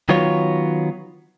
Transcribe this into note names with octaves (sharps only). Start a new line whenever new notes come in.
D#3 F#3 B3 F4 C#5